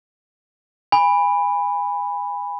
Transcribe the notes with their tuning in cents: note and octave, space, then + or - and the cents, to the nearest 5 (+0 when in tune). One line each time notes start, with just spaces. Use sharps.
G#5 -30 B5 +0